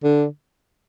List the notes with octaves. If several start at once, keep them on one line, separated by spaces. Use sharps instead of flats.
D3